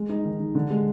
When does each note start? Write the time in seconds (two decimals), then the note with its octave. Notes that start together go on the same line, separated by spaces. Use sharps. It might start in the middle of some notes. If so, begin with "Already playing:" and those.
Already playing: G#3
0.09 D#4
0.25 D#3
0.40 D#3
0.55 D3
0.70 G#3